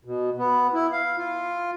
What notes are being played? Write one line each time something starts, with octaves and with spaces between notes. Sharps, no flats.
B2
B3
E4
F5
F4